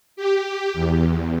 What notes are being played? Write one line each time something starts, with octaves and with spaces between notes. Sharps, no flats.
G4
E2